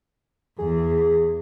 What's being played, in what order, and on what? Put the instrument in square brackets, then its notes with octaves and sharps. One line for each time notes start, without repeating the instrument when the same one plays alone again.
[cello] E2 [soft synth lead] G#4